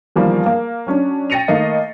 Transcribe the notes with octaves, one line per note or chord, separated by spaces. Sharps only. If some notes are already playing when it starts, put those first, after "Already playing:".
E2 D#3 F3 G3 A#3
A#3
F#3 C#4 D4
G5 A6 A#6 C#7 D#7 F7
D#3 A3 A#3 D#5 C7